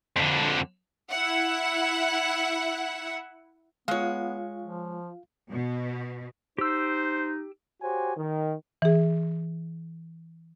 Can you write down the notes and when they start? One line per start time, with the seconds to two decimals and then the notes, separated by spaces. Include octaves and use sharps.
0.16 F2 D3
1.10 E4 E5 F#5
3.88 G#3 B3 F4 C#5 F5
4.63 F3
5.50 B2
6.58 D#4 G4 C5 E6
7.82 F#4 G4 C5 C#5 G#5
8.17 D#3
8.82 E3 G#4